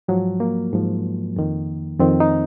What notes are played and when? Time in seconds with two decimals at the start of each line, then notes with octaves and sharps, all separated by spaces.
0.08 G#2 F3 F#3
0.40 A#3
0.72 G#2 F3
1.36 F2 D#3
1.99 F2 D#3 C4
2.20 D#4